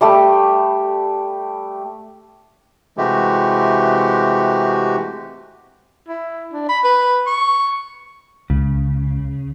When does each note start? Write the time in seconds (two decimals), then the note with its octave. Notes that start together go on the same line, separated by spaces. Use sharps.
0.01 G3 A3 G4
2.97 C3 E3 G#3 A3 F#4 G4
6.09 E4
6.53 D4
6.69 B5
6.84 B4
7.27 C#6
8.50 C#2 C#3